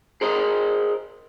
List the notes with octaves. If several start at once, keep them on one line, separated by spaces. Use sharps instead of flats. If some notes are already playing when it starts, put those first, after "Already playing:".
G#4 A#4 C5 D#5